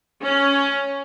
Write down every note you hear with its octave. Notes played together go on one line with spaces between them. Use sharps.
C#4